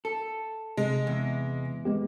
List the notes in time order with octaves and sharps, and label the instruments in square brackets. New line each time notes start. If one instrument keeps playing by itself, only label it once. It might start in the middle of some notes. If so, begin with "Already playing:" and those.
[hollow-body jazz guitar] A4
[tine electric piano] C3 [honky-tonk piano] G#3
[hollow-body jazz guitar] E2
[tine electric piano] G#3 B3 G4